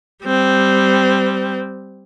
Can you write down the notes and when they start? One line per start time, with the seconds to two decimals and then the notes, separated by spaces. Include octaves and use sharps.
0.24 G3 C4